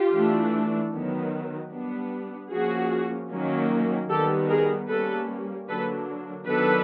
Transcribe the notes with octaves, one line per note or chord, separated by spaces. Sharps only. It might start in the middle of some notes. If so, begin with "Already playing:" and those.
Already playing: F4 G4
E3 A3 D4
D#3 F#3 B3
G3 B3 D4
F3 A#3 C#4 F#4 G#4
D#3 F#3 A#3 C#4
D#3 G3 B3 G4 A4
G#4 A#4
G3 A#3 C#4 A4 B4
D3 F#3 A#3 D4 A4 B4
D#3 F#3 B3 D4 A4 B4